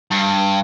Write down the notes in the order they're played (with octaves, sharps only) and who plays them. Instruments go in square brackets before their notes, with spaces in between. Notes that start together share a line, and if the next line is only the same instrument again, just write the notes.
[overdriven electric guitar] G2